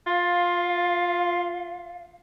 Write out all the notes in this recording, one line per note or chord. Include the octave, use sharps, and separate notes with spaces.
F4 F5